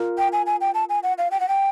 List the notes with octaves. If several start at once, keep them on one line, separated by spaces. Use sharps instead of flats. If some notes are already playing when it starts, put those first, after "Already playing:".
Already playing: F4 A#4
G5
G#5
G#5
G5
A5
G#5
F#5
F5
G5
F#5
G5